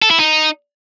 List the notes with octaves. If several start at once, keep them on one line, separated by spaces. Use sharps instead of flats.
A4
E4
D#4